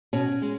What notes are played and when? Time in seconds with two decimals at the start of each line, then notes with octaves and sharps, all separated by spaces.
0.13 B2 C#4
0.42 G#3